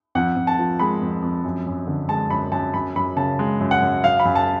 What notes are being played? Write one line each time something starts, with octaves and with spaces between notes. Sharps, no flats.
F2 F#5
F2
A5
F3
G#3 B5
F2
F2
F#2
F#2
D3
G#3 A5
F#2 B5
F#2 A5
F#2 B5
F#2 B5
C#3 A5
G#3
F#2
F#5
F#2
F#2 F5
B5
F#2
A5